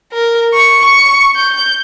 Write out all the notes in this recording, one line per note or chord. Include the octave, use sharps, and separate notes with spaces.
A#4
C#6
C#6
G6